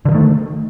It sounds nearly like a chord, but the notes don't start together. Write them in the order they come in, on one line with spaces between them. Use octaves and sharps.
D3 F3 D#3 A3